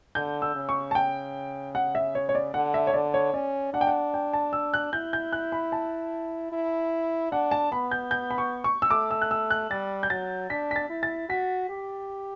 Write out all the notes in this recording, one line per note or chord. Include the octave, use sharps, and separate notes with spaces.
D3 G6
E6
C#3
C#6
A5
C#3 G5
F#5
E5
C#5
C#5
D5
D3 F#5
E5
C#5
D3 D5
C#5
C#4 D5
D4 F#5
G5
F#5
G5
A5
E6
F#6
E4 G6
G6
F#6
B5
A5
E4
D4 F#5
A5
B3 B5
G6
G6
B5
C#6
C#6
E6
A3 D6
E6
F#6
E6
F#6
G3 A6
G6
F#3 A6
D4 B6
B6
A6
E4
A6
F#4 B6
G4